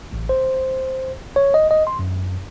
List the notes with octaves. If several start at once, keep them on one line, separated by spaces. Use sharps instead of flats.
A1
C5
C#5
D#5
D#5
C6
F#2